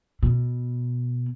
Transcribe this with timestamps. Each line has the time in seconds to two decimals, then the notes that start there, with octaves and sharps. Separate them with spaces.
0.23 B2